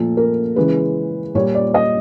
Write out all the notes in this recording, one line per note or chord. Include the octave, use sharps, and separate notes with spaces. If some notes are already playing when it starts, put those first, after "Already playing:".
Already playing: A#2 F3 A3 A4
A#4
C#3 E3 G#3 B4
A#2 G3 A#3 C#5
D5
D#5